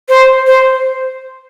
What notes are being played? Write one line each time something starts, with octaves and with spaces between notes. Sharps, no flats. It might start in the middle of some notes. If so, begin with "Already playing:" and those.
C5
C5